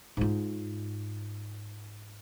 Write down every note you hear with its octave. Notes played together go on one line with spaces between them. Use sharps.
G#2 F4